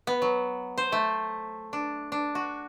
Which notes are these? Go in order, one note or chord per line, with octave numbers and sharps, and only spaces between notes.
B3
F#3
C5
A3
D4
D4
F#4